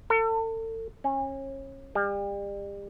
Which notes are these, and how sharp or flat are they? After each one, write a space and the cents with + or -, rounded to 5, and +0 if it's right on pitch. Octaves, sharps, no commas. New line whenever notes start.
A4 +35
C#4 -30
G3 +35